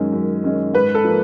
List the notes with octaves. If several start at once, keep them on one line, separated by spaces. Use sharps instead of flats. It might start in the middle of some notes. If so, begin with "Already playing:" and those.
Already playing: F#2 D#3 G#3 C#4
F#2
D#3 G#3 C#4
G#2 B4
A4
F3 A#3